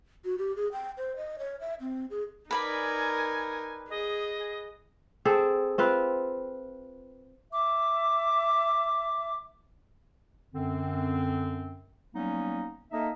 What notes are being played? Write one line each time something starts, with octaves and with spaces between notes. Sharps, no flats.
F#4
G4
G#4
G5
C5
D#5
C#5
E5
C4
G#4
D#4 A#4 B4 D5 G#5 B5
G#4 D#5
C4 G#4 A4
C4 F4 B4
E5 D6
F#2 D3 C4
F#3 G3 A#3 B3 C#4 D#4
A#3 D#4 A4 D#5 E5